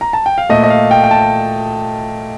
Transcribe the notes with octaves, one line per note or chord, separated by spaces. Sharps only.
A#5
A5
G5
F5
A#2 A3 D#5
D#5
F5
G5
G5
A5